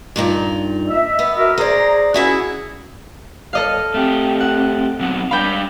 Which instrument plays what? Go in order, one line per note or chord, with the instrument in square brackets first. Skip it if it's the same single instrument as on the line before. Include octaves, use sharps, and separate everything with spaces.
[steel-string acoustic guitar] G2 A#2 D#4
[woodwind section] D#5 E5
[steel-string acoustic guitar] B3
[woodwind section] F#4 A#4 E5
[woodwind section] G#4 A#5 [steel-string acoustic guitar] C5 D5
[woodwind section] C#4 E4 G#4 [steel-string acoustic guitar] F#4 E5 F#5
[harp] A4 D#5 F5
[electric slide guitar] A3 G4 [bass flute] C4
[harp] F#5
[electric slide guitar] A#2 F#3 B3
[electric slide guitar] G3 D4 F5 [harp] G5 B5